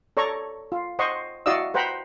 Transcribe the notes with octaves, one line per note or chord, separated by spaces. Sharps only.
A4 C#5 D5 A#5 C#6
F4
C5 D#5 F#5 C6 C#6
E4 F#4 D5 D#5 F5 E6
B4 C5 F#5 G5 A#5 B5